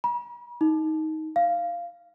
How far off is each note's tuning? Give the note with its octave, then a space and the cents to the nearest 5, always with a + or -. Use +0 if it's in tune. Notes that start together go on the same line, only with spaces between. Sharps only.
B5 -45
D#4 +15
F5 -10